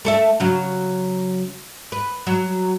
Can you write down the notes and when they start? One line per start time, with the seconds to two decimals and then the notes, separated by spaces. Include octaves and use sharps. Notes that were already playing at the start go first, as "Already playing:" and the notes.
0.05 A3 A4 E5
0.40 C#3 F#3
1.92 B4
2.27 F#3